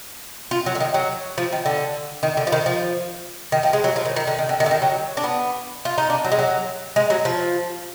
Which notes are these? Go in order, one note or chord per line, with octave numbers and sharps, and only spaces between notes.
F4
F#3
D3
D#3
F#3
F3
D#3
D3
D#3
D3
F3
D#3
F3
D#3
F3
G#3
F#3
F3
D#3
D#3
D3
D#3
D3
D#3
D3
D#3
F#3
D4
B3
F4
D#4
D4
F#3
G#3
F#3
G#3
F#3
F3